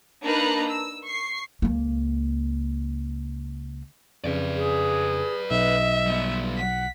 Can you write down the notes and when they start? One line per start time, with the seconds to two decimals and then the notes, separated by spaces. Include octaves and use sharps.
0.23 A#3 D4 D#4 B4 A#5 F#6
0.68 E6
1.03 C#6 C7
1.62 C#2 A#3
4.24 F2 C#3 B4 D5
4.55 G#4
5.51 B1 D#5 E5
6.07 G3 B3
6.58 F#5 B6